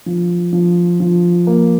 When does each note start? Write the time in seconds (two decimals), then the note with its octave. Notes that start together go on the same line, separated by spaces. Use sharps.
0.06 F3
0.53 F3
1.00 F3
1.47 A#3